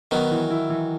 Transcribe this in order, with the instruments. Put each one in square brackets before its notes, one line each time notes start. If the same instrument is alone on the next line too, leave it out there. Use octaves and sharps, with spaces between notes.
[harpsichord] D#3 F#3 [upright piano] B3
[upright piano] E3
E4
E3